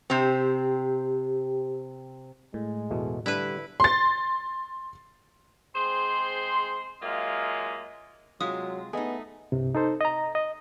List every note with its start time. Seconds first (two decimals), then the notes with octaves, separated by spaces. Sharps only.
0.10 C3 C4 G4
2.54 A2 G#3
2.91 E2 B2 A3
3.26 D3 G3 D4 E4 B4
3.80 C6 A6
5.75 G#3 C4 G#4 C5 C6
7.02 F#3 G#3 A#3 F4 D#5 E5
8.41 C3 F#3 G#3 F4 D#6
8.93 A3 B3 D#4 G#4 D#5
9.52 C2 G2 C3
9.75 D#4 A4 C5
10.01 D#5 A#5
10.35 D#5